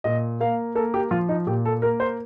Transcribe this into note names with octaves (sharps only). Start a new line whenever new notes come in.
A#2 D#5
A#3 F5
A#3 A4
G4
F3 F4
D#4
A#2 G4
A4
A#3 A#4
C5